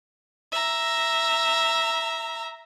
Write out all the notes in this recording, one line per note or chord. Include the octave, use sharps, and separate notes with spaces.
E5 A#5